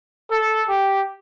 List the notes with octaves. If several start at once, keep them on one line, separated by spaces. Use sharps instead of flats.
A4
G4